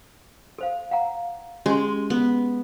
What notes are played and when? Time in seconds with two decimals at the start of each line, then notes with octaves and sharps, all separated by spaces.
0.58 A4 C5 F5
0.91 F5 F#5 A#5
1.66 G#3 C#4 G4 C6
2.10 B3